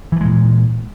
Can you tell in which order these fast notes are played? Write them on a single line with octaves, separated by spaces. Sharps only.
E3 F3 G#3 A#2